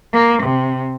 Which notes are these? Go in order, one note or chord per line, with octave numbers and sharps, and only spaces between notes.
A#3
C3